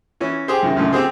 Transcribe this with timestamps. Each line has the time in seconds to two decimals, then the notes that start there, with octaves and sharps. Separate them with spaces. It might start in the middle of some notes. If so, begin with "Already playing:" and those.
0.21 E3 C#4
0.48 G4 G#4 C5
0.63 F#2 C3 D#3
0.77 C#2 F#2 A2 D3
0.92 C4 G4 G#4 C5